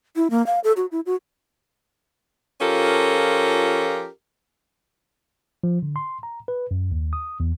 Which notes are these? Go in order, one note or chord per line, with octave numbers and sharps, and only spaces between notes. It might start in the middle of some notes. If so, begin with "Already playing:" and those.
E4
A#3
F5
A4
F#4
E4
F#4
F3 C#4 F4 G4 A4 A#4
F3
D3
C6
A#5
B4
F#2
D#2
D#6
E2